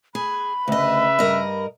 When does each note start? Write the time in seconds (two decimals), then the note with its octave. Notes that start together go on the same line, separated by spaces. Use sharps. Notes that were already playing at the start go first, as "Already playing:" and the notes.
0.15 G#4 B5
0.68 D2 C#3 B4 D#5 E5
1.19 G2 A#4 D#5